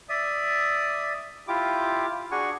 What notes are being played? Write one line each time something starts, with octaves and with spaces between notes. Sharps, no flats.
D5 E5 D#6
E4 F4 G4 D6
D4 F#4 G#4 F#5 G#5 C#6